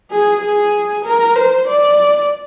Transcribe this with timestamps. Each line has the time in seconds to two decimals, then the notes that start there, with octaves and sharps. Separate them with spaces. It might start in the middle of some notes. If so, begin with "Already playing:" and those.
0.11 G#4
0.41 G#4
1.04 A#4
1.36 C5
1.68 D5